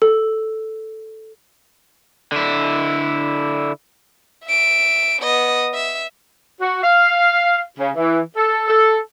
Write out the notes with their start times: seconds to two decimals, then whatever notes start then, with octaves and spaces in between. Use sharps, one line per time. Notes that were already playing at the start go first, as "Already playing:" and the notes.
0.02 A4
2.32 D3 E4
4.45 E5 D7
5.22 B3 D#5
5.74 E5
6.60 F#4
6.83 F5
7.78 C#3
7.96 E3
8.36 A4
8.68 A4